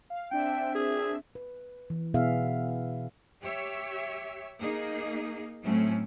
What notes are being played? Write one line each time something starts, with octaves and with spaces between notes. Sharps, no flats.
F5
C4 D4 E5 G5
G#4
B4
E3
B2 B3 E4 G#4 E5 F5
G4 C#5 E5
A#3 D#4 G#4
A2 F#3 A3 C4 C#4